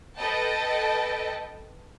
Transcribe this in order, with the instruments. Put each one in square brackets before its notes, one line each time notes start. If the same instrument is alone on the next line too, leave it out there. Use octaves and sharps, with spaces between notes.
[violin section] A4 B4 D#5 G5 A5